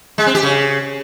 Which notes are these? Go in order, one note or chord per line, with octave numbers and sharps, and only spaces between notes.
G#3
C4
G4
C#3